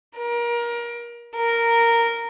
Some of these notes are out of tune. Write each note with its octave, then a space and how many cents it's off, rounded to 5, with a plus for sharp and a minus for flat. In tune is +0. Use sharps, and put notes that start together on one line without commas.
A#4 +25
A#4 -5